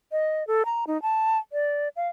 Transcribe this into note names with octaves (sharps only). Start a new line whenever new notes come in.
D#5
A4
A#5
D#4
A5
D5
F5